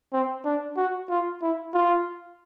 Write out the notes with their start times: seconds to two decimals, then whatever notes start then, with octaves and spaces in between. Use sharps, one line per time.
0.13 C4
0.45 D4
0.77 F#4
1.10 F4
1.42 E4
1.74 F4